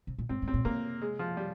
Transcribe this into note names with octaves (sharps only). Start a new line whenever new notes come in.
C3
A#2
G#2 C4
G#2
C4
A#2
C3 A#3
G#3
F3
G3